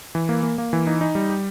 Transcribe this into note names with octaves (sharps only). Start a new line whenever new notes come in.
E3
A#3
A#3
A#3
E3
D#4
D#4
G3
G4